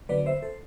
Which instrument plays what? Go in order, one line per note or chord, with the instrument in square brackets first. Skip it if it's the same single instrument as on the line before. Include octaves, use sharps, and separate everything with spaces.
[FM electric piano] D3 F#3 B3 B4 D5
C5 E5
A4 C5